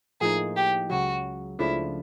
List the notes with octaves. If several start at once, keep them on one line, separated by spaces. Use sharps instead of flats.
A2 F3 A#3 D#4 G#4
G4
C#2 C#3 F#3 F#4
C#2 C#3 F3 A3 D4 E4